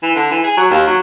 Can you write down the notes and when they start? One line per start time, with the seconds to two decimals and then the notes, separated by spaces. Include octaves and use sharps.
0.03 E3
0.15 D3
0.31 E3
0.44 G#4
0.57 F#3
0.70 D#2
0.87 F#3